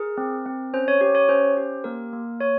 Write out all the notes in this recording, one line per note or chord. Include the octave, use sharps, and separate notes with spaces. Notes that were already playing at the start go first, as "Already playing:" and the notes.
Already playing: G#4 A#4
C4
C4
C#4 C5
C#5
G4 C#5
C#5
C#4 C5
G4
A#3 A#4
A#3
A#3 C#5